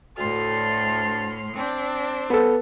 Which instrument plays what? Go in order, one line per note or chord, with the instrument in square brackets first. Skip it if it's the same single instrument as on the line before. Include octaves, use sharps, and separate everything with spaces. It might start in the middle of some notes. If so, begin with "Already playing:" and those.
[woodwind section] D2 A5 [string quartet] A2 C6 F6
[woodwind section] C4 [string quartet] D4
[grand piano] B3 A4